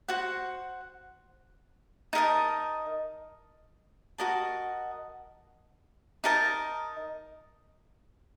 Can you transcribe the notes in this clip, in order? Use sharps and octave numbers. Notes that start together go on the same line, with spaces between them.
F#4 C5 F#5
D#4 A#4 D#5 A5
F#4 A#4 D#5 A5
D#4 A#4 D#5 A5